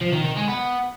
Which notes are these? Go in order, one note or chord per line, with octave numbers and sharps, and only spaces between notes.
F3
D#3
D#3
G#3
B3